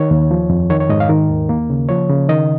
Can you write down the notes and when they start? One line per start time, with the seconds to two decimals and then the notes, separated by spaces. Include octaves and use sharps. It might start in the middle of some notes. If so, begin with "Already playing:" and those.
Already playing: D#3 C#5
0.11 D#2
0.31 F3
0.50 F2
0.70 D#3 C#5
0.80 C#5
0.89 G#2 D#5
1.00 F5
1.09 D#3 A#4
1.29 D#2
1.49 A#3
1.70 C#3
1.89 F3 C#5
2.09 C#3
2.29 D#3 D#5